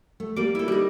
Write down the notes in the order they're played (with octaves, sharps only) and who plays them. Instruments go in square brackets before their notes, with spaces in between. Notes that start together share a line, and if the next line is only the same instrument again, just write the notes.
[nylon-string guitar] A3
[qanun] G3 D6 [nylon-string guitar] A#3
[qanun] E4 A4
G3 D#4